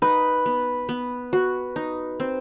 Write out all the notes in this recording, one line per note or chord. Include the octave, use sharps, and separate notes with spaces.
D#4 B4
B3
B3
F#4
D#4
C4